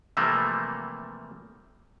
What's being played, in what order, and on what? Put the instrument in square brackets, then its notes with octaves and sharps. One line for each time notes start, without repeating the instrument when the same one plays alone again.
[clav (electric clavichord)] C3 E3 F3 G3 A3 A#3